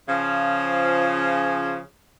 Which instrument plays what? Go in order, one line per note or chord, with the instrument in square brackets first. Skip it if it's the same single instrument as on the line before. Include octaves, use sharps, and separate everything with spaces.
[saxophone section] C#3 F3